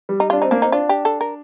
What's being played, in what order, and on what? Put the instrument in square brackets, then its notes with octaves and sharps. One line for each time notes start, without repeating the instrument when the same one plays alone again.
[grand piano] G3
[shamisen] D#4
[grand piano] D4 [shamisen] F4
[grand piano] C4 [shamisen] D#4
[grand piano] A#3 [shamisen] D4
[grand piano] C4 [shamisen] D#4
[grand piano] D4 [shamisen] F4
[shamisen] G4
A4
A#4